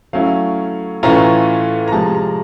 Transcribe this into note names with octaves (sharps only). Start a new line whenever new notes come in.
F#3 A3 C#4 E4 F5
A2 E3 A3 C#4 F4 A#5
A#5
C3 F3 G#3 A5
A#5